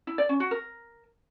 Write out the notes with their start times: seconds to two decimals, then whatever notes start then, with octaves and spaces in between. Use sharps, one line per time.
0.07 E4
0.18 D5
0.29 C#4
0.40 F#4
0.51 A#4